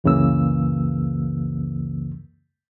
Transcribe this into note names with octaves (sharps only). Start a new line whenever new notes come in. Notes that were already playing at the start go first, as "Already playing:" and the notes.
C#2 F#2 C#3 E3 A#3 E6